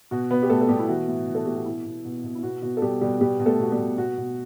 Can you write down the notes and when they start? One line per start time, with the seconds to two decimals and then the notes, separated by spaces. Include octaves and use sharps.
0.11 B2 F#4
0.31 B2 B3 B4
0.43 G4
0.50 B2 A3 A4
0.61 A4
0.69 B2 G3 G4
0.79 E4
0.89 E3 F#4
1.08 A2
1.27 E3
1.35 A4
1.45 A2 G4
1.56 F#4
1.66 B2 E4
1.85 B2
2.05 B2
2.24 B2
2.35 E4
2.43 B2 F#4
2.62 B2 F#4
2.77 A4
2.82 B2 G3 G4
3.01 B2 G3 G4
3.21 B2 G3 G4
3.40 B2
3.46 A3 A4
3.59 B2 F#4
3.72 G3 G4
3.78 B2
3.98 B2 F#4
4.17 B2